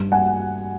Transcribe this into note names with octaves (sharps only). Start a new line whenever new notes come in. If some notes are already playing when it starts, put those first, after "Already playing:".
Already playing: G2
F#5 G#5